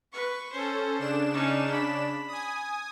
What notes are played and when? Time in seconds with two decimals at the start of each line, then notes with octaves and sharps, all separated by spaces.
0.13 B4 C#6
0.53 C#4 A4 C5
0.99 C#3 D4 E7
1.33 C#4 D#4
1.73 B5
2.28 G#5 D#6